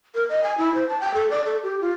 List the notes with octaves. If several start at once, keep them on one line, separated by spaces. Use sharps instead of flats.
A#4
D#5
G#5
E4
C5
A5
G5
A4
D5
A4
G4
F4